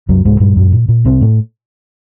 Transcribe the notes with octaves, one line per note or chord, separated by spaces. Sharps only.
C2 F#2 F#3
C2 G#2 G#3
G2 A#2 G3
F#2 A#2 F#3
A#2
A#2
C2 C3 C4
A2 A3